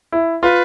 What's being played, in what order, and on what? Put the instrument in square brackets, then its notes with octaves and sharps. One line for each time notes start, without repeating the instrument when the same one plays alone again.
[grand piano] E4
[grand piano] F4 [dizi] B4